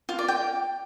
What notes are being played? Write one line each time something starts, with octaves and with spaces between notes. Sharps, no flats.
F4
D5
G5